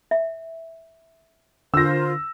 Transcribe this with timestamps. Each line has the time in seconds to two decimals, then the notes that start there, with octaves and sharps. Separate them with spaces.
0.11 E5
1.74 D3 F4 A#4 C5 E6 A#6